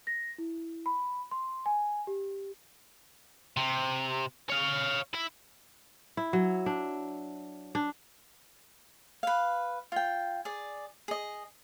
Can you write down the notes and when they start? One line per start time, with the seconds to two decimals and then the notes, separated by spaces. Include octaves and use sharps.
0.07 A#6
0.38 E4
0.86 B5
1.31 C6
1.66 G#5
2.07 G4
3.57 C3
4.50 C#5 F5
5.13 E4 E5
6.17 E4
6.33 F#3
6.66 D4
7.75 D4
9.23 B4 F5
9.92 F4 G5
10.45 G#4 D5
11.08 G#4 D#5